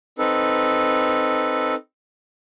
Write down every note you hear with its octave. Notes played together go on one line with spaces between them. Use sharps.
C4 D#4 A4 B4